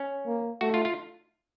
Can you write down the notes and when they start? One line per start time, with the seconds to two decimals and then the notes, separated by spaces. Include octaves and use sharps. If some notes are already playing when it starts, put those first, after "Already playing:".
Already playing: C#4
0.26 A#3
0.61 A3 F#4
0.74 F4
0.85 F4